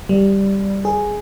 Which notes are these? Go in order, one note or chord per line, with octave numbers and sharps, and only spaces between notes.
G3
G#4